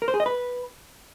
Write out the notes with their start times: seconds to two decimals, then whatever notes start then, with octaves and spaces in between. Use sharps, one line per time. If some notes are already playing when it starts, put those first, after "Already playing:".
0.02 A#4
0.08 C5
0.14 G#4
0.20 D#5
0.26 B4